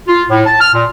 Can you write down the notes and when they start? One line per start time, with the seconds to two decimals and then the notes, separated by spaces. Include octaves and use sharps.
0.07 F4
0.30 A2
0.46 A5
0.60 F6
0.74 A#2